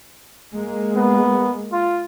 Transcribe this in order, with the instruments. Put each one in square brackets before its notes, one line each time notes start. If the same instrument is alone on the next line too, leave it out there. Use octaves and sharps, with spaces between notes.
[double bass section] G#3 A#3
[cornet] B3
F4